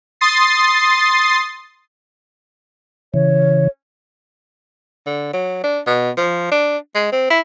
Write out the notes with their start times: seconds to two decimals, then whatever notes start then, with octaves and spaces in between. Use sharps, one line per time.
0.21 C6 D#6 A6 C7
3.14 C#3 E3 C#5
5.06 D3
5.33 F#3
5.64 D4
5.87 B2
6.17 F3
6.51 D4
6.95 G#3
7.12 C4
7.30 E4